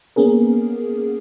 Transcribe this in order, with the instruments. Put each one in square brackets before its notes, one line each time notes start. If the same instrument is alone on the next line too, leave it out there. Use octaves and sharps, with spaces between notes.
[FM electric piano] A#3 B3 C#4 G#4 A#4